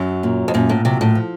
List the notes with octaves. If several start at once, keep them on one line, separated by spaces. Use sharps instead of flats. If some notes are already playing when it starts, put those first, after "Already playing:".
Already playing: F#2 F#3
A#2
F2
F#2 A#2
A2
C3 F#3
A2
F3